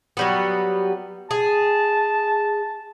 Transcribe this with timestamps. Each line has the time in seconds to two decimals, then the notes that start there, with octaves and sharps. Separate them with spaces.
0.17 F#3 G3 B3
1.31 G#4 A5